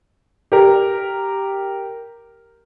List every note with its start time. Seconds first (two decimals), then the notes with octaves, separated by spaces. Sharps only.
0.52 G4 A#4